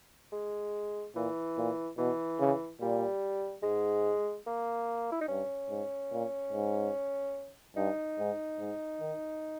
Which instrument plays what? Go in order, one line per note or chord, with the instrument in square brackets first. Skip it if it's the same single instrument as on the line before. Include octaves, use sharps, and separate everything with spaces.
[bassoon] G#3
[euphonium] A#2 [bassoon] E3
[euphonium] A#2
[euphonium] B2 [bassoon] E3
[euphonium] C#3
[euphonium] A#2 [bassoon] G3
[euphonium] G#2 [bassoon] G#3
[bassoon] A#3
E4
D#4
[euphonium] G2 [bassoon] C#4
[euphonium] G#2
A#2
G#2
[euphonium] G2 [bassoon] D#4
[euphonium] G#2
G#2
D#3